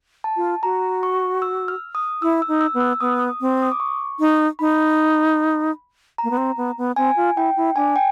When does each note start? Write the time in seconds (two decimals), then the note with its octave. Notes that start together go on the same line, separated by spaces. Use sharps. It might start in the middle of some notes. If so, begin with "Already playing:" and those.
0.24 A5
0.36 F4
0.63 F#4 A#5
1.03 C#6
1.42 E6
1.68 F6
1.95 D#6
2.22 E4 E6
2.42 E6
2.48 D#4
2.61 E6
2.74 B3
2.80 E6
3.00 B3 D#6
3.41 C4
3.62 D#6
3.72 D6
3.80 C#6
4.19 D#4
4.59 D#4 B5
6.18 A#5
6.24 A#3
6.30 B3
6.37 C4
6.57 B3
6.78 B3
6.96 C4 G#5
7.16 F4
7.36 E4 G5
7.56 E4
7.76 D4 G#5
7.96 G5